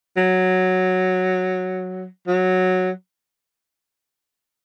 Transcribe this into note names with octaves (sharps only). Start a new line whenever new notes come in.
F#3
F#3